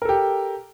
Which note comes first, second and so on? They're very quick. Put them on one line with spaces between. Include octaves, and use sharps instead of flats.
A#4 A4 G4